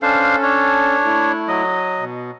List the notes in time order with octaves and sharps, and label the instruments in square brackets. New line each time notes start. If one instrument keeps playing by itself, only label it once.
[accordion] C#4 A4 [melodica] D4 C5 F5
[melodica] D4 C#5
[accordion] A3 E4
[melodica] F#3 D#5
[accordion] B2